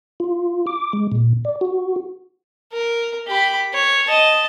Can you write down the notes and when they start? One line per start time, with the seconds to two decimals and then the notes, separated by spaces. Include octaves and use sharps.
0.20 F4
0.67 D6
0.93 G#3
1.12 A#2
1.45 D5
1.61 F#4
2.73 A#4
3.28 G4 B5
3.73 C#5
4.07 D#5 A5